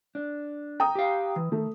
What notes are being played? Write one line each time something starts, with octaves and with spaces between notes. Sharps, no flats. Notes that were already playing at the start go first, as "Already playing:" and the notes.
D4
G5 A#5 D#6
G4 F5
E3
D#3 A3